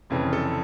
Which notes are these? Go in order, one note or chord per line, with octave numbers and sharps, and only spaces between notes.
F1 F2 C#3 E3
A4